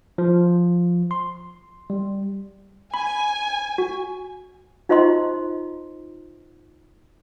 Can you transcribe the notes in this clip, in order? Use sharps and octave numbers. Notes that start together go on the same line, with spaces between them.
F3
C6
G3
G#5 B5
F#4
D#4 F4 C5 D#5 A#5 C6